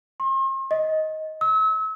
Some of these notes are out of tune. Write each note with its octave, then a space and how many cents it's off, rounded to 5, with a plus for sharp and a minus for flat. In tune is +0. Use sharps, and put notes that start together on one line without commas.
C6 +45
D#5 +15
E6 -35